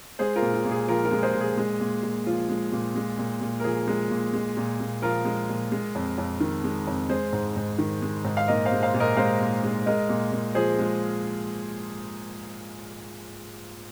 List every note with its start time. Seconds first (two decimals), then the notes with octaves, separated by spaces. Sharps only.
0.19 G#3 G#4 C5
0.36 F4 A#4
0.42 A#2
0.54 F4
0.65 A#2
0.71 G#4
0.88 F3 F4 A#4
1.05 F4 A#4
1.11 G#3
1.23 G#4 C5
1.34 A#2
1.40 G#4
1.57 G#3
1.80 A#2
2.03 A#2
2.26 F3 F4
2.49 G#3
2.72 A#2
2.96 G#3
3.18 A#2
3.41 A#2
3.60 A#4
3.64 F3 G#4
3.87 G#3
4.10 A#2
4.33 G#3
4.57 A#2
4.80 A#2
5.02 F3 F4 A#4
5.25 G#3
5.49 A#2
5.72 G#3
5.95 F2
6.18 F2
6.40 D#3
6.64 G#3
6.87 F2
7.09 G#3 G#4 C5
7.33 G#2
7.56 G#2
7.78 D#3
8.02 G#3
8.24 G#2
8.37 F5
8.48 A#2 A#4 D#5
8.65 C5 F5
8.72 G#3
8.83 C5 F5
8.94 A#2
9.00 A#4 D#5
9.17 G#3 C5 F5
9.40 A#2
9.63 G#3
9.86 G#3 A#4 D#5
10.09 A#2
10.32 A#2
10.55 F3 G#4 C5
10.79 G#3